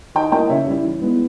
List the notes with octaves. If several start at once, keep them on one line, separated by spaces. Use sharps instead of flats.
D#3 D#5 G5
A#3 E4 D#5 G5
C#3 C#5 E5
G3 C#4 E4
E3
G#3 B3 E4